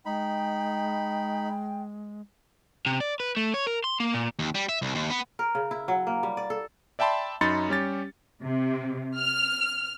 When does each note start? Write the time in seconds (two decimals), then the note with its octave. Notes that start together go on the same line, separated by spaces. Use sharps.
0.06 G#3 D#4 G5 B5
2.86 C3
3.00 D5
3.20 B4
3.37 A3
3.54 C#5
3.66 A#4
3.84 C6
4.00 A#3
4.14 A#2
4.39 D#2
4.55 G3
4.69 E5
4.82 C2
4.95 D#2
5.10 B3
5.39 A#4
5.55 C#3
5.71 E4
5.88 F#3
6.07 A#3
6.23 G3
6.37 D5
6.50 A4
6.99 D5 E5 G5 A5 B5 C6
7.41 F#2 D#4 B5 C6 A6 C#7
7.69 G3 C#4 G4 A6
8.42 C3
9.17 F6